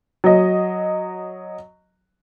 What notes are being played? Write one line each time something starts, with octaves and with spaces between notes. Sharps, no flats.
F#3 D#5